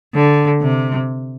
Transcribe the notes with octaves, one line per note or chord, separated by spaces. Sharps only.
D3
C3